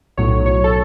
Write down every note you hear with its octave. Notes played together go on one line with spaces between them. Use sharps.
B1 A2 F#3 C#5
C#5
A4